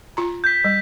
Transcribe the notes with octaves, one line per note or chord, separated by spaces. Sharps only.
F4 A#5
G6 B6
G3